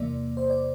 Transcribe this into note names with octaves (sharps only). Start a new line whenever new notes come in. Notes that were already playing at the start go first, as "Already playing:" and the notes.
Already playing: E2 C3 E3 A#3 D5
C5
D5